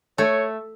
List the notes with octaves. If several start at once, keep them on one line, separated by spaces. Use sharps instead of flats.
A3 C#5